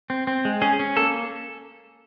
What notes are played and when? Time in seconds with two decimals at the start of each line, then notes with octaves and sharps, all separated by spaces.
0.10 C4
0.27 C4
0.45 G#3
0.62 C#4 G#4
0.79 C#4
0.96 A#3 A4